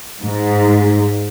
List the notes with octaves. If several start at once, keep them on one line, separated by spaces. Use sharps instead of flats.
G#2